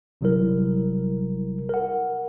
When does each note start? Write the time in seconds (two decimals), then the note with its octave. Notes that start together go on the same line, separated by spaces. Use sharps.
0.21 G1 C3 F#3 G3 E4 A#4
1.69 A#4 F#5